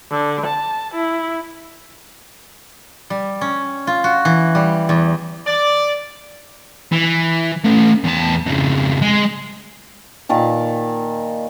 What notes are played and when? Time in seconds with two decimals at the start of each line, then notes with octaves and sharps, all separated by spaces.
0.10 D3
0.46 A5
0.95 E4
3.10 G3
3.41 C#4
3.87 F4
4.04 F#4
4.25 E3
4.55 G3
4.89 E2
5.46 D5
6.92 E3
7.64 A3 C#4
8.04 E2 A5
8.46 F2 C#3
9.02 G#3
10.29 A#2 D#3 A5